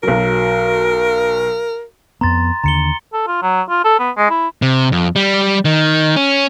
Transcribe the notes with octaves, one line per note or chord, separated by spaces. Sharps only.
B1 F#3 A#4
F2 B3 A#5 C6 A6
D#2 D3 A#5 C#7 G7
A4
F4
F#3
F4
A4
B3
G#3
E4
C3
F2
G3
D#3
C#4